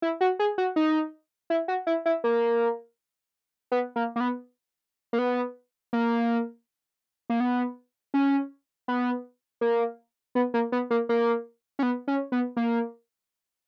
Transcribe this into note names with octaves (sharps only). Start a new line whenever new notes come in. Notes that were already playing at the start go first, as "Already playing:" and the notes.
E4
F#4
G#4
F#4
D#4
E4
F#4
E4
E4
A#3
B3
A#3
A#3
B3
A#3
B3
A#3
A#3
B3
C#4
B3
A#3
B3
A#3
B3
A#3
A#3
C#4
B3
C#4
B3
A#3